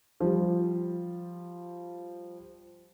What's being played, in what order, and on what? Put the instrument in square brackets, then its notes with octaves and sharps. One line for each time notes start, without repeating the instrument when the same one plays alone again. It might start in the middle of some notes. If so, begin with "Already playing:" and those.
[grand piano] F3 G3